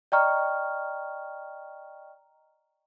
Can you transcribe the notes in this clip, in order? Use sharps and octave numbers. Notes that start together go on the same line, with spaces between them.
D5 D#5 G5 A#5 C#6 F6